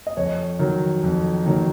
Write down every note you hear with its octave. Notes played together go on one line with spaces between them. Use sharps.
D#5
F2 C#5
D#3 F#3
F2
D#3 F#3